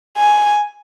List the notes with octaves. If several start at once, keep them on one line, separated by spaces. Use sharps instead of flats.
G#5